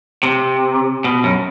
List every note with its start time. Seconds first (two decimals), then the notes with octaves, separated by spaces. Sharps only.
0.23 C3
1.04 B2
1.24 F#2